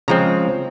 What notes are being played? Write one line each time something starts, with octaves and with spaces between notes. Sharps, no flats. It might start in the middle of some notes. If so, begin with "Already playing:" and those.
C#3 F3 G#3 C4 A#5